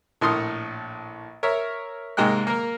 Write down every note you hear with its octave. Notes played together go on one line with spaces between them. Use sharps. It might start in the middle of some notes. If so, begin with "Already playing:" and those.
A#1 A2 C6 D#6 F6
A#4 C#5 E5
G#2 C3 G#3 A#3 G5 F#6
A#3 A#4